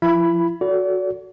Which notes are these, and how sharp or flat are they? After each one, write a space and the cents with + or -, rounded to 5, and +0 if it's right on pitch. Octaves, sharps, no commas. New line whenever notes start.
F3 +0 E4 +35 B5 +0
F#4 -5 A4 -10 D5 -40